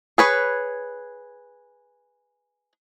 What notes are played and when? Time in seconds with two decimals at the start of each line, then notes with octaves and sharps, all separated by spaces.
0.18 G#4 B4 C#5